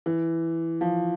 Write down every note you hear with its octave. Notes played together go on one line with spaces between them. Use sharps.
E3
F3